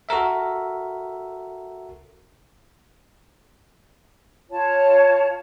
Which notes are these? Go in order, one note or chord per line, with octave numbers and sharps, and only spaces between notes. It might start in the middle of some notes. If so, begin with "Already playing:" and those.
F#4 A4 A#4 E5
F4 C#5 A5